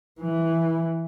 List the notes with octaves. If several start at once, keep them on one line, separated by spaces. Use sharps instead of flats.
E3